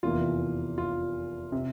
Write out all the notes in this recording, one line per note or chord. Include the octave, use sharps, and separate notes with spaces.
F1 E2 E3 A#3 F4
F4
C3